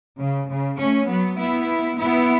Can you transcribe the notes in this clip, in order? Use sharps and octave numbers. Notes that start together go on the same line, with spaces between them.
C#3
C#3
A3 C#4
F#3 B3
B3 E4
B3 E4